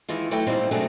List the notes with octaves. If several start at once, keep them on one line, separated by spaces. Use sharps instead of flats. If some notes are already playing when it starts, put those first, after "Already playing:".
D#3 E3 G#3 F4
E3 F#3 A3 E4 G5
A#2 G3 C4 D#4
B2 F#3 A3 D4 G#4